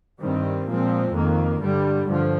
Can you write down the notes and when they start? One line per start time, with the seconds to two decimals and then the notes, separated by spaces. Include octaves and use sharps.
0.21 G2 D#3 G3 C4
0.67 A#2 F3 G#3 C4
1.14 F2 D#3 A#3
1.60 G2 D3 G3
2.07 G2 D3 F3